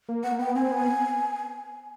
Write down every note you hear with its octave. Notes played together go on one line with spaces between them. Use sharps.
A#3
B3 F#5
A#3
B3 G5
C4 G#5
B3